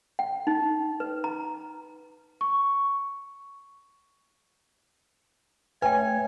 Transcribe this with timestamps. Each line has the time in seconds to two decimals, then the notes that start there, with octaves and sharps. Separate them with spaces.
0.19 G5
0.47 D#4
1.00 B4
1.24 A#5
2.41 C#6
5.82 A3 B4 C#5 G5 G#5